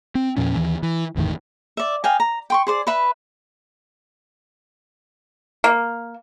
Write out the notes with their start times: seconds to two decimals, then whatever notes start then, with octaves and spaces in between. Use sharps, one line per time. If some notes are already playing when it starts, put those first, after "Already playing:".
0.15 C4
0.37 E2 A#2 F3 C#4
0.56 D#2 E3
0.83 E3
1.16 G1 E2 A2 D#3
1.77 D5 E5
2.04 D#5 F5 G5 G#5
2.20 A#5
2.50 G5 C6 C#6
2.67 G#4 C5 D5
2.87 B4 E5 B5
5.64 A#3